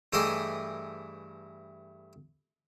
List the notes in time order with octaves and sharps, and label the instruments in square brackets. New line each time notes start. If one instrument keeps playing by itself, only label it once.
[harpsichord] G2 E3 A3 G4 G#4 D#5